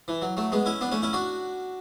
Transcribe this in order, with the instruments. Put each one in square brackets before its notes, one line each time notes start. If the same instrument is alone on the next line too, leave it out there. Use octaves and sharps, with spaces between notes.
[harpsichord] E3
F#3
F#3 A3
G#3 B3
C#4 E4
B3 D4
A3 C#4
C#4 E4
D4 F#4